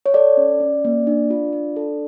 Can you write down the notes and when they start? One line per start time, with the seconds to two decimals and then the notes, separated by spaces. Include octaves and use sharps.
0.06 C#5
0.14 A4 D5
0.37 C#4
0.60 C#4
0.85 A#3
1.07 D4
1.30 F4
1.53 D4
1.76 A4